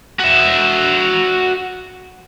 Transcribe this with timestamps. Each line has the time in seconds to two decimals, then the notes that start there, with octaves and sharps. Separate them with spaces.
0.20 F#4 E5